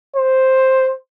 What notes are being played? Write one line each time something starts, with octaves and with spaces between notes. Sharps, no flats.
C5